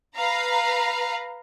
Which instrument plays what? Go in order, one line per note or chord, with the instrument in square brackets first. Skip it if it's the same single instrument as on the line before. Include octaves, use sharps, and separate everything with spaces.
[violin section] B4 F5 A#5